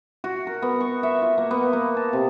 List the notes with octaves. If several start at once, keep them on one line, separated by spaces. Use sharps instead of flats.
F#4
A#4
B3
C#6
E5
F4
A#3
B3
A#3
A5
C3